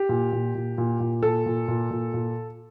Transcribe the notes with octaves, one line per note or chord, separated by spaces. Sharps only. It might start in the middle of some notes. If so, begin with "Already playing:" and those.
Already playing: G4
A#2
A#2
A#2
A#2
A#2
A#2 A4
A#2
A#2
A#2
A#2